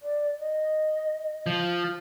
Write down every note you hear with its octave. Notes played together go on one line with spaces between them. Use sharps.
D5
D#5
F3